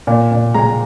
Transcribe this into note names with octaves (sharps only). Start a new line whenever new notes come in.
A#2
A#2
G#3 A#5